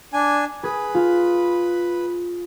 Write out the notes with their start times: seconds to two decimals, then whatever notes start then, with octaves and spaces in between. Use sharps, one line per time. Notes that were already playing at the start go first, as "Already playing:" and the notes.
0.13 D4 G#5
0.63 G#4 B4
0.95 F4